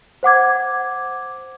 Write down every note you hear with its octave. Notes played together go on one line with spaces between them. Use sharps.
C5 F#5 D6 G#6